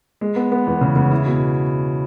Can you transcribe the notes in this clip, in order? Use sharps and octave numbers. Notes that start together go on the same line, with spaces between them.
G#3
B3
B3
E2
C#3
C#3
E4
B2